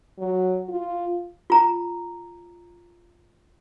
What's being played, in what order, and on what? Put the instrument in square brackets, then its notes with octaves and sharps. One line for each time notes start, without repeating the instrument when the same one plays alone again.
[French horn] F#3
F4
[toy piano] F4 A#5